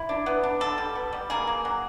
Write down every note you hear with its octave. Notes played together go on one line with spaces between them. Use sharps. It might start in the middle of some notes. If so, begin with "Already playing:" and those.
Already playing: E4
D4
B3
D4
D3 A4
G3
B3
G3
A#3 G#4
A#3
F#3